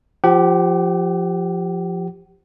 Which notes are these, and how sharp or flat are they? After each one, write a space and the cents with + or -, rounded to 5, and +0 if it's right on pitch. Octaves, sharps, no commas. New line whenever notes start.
F3 +0 G4 +0 F#5 +45